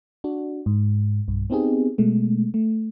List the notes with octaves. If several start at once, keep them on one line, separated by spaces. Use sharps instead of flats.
D4 F#4
G#2
B1 G2
B3 C4 D#4 G4 G#4
B2 G#3 A3
A3